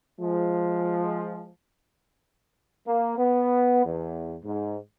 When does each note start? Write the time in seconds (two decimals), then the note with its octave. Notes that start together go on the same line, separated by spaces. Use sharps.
0.20 F3 G#3
2.87 A#3
3.18 B3
3.85 E2
4.44 G#2